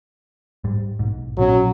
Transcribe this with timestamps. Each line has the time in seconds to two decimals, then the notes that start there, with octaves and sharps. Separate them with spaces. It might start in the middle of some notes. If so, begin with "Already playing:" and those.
0.64 G#2 G3
0.99 B1 G#2
1.38 A#1 B2 F#3 C#4